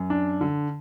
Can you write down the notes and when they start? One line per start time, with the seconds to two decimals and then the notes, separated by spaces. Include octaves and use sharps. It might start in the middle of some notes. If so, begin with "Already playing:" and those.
Already playing: F#2
0.10 D4
0.41 D3